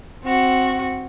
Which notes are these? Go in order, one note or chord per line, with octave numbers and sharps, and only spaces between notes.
C4 F#4